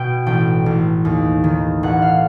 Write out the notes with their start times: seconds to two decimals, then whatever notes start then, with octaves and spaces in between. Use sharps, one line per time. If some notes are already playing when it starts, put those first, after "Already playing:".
Already playing: B2 G5
0.27 A1 G5
0.66 A1
1.05 D#2
1.44 D#3
1.83 A1 F#5
2.02 F5